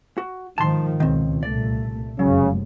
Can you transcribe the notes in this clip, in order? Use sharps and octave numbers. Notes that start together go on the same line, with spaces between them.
F#4
G#2 D#3 F3 A5 C6
C#2 B2 D#3 C4
C2 A#2 A3 D5
F1 F#2 C#3 F#3 G#3